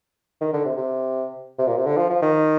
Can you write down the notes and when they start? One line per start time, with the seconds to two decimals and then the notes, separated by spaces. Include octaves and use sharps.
0.41 D#3
0.53 D3
0.65 C3
0.77 C3
1.59 C3
1.67 A#2
1.77 C3
1.86 D3
1.97 F3
2.10 F3
2.22 D#3